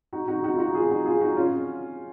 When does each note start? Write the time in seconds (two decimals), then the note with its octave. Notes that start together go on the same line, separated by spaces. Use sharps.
0.13 D#4 F#4
0.28 D#4 F#4
0.44 D#4 F#4
0.55 F4
0.59 D#4 F#4
0.75 F4 G#4
0.90 D#4 F#4
1.06 F4 G#4
1.21 D#4 F#4
1.37 C#4 F4